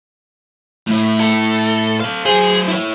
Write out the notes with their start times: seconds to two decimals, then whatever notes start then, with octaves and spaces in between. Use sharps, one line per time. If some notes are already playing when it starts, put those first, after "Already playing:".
0.87 A2 E4
1.20 A4
2.00 A4 F5
2.25 F#3 G#4 C5
2.68 E4 C#5